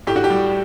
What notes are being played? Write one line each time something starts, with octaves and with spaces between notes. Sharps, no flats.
A2 G4
F#4
G4
G3